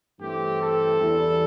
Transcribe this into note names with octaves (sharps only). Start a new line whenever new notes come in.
G2 E3 A3 C4 G4
A4
E2 E3 G3